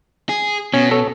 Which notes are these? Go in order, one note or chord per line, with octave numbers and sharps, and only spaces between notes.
G#4
B2 C#4
A4 C#5